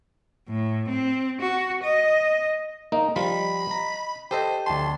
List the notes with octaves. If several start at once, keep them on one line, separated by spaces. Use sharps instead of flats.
A2
C4
F#4
D#5
A#3 D#4 D#5
F3 G3 F4 B5
A#5
G4 A4 C5 D#5 D#7
D2 A5 C6